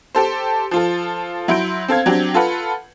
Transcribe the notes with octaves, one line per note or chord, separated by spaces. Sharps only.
G4 A4 C5
F3 F4 A4
F#3 E4 C6 G6 D7
C4 A4 F5 G#6
F#3 C4 D4 G4
F4 A4 B4 F#5